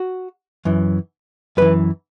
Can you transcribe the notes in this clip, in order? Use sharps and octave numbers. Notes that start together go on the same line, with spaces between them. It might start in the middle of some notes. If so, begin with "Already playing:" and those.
Already playing: F#4
F#2 E3
F#2 E3 B4